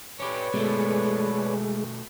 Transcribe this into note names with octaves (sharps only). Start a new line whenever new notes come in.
C#4 G4 B4 C#5 D5
B2 G#3 A3